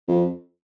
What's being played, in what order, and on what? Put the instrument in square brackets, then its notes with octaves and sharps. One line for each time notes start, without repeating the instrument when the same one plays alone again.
[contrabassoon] F2